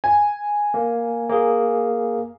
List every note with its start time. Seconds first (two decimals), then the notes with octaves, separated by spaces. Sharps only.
0.04 G#5
0.74 A#3
1.29 A#3 G#4